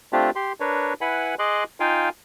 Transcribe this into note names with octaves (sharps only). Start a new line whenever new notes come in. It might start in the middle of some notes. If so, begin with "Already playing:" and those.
A3 C4 D4 F4 G4
G4 C6
D4 A#4 B4 C#5
E4 B4 F#5 G#5 B5
G#4 D#5 C6 D6 F#6
D#4 F4 F5 G5 G#5